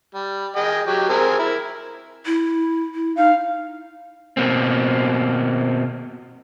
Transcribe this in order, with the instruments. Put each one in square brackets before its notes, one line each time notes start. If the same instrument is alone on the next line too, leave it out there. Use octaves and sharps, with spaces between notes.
[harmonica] G3
G#4 D#5 G5
F#3 G4
C4 G#4 A#4
E4 A#4
[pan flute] E4
E4
[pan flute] D#4 [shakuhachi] F5
[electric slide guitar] B2 A#3 C4